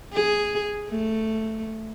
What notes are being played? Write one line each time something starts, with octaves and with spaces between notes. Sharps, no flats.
G#4
A3